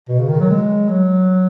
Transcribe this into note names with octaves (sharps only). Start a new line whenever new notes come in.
B2
C#3
D#3
F#3
G#3
F#3